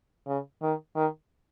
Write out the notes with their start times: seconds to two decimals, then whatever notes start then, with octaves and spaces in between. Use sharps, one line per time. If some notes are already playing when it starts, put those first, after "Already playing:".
0.27 C#3
0.62 D#3
0.96 D#3